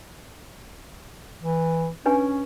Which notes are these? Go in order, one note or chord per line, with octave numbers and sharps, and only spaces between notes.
E3
C#4 D4 B4 G#5